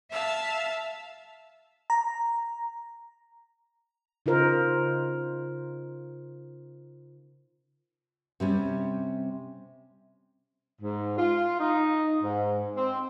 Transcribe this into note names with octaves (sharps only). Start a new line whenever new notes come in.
E5 F5 A5 E6
A#5
C#3 D#4 F4 A#4 C5
C3 G3 C#4
G#2
F4
D#4
G#2
C4